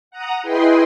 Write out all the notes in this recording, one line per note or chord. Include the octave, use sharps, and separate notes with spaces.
F#5 A#5 D#6
E4 G#4 B4 D#5 G5 C6